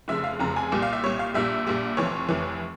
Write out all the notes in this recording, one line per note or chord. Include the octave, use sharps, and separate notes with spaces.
F1 F2 C#3 E5
F5
F1 F2 C#3 A#5
G#5
C2 A#2 G3
F5
E5
C2 A#2 G3 C#5
F5
A#1 A#2 G3 E5
A#1 A#2 G3
F1 F2 E3 C#5
F1 F2 E3